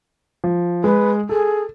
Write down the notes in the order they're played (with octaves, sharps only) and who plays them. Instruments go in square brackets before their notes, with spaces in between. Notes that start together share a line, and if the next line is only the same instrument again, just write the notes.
[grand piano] F3
[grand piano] G#3 [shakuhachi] B4
[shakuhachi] G#4 [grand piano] A4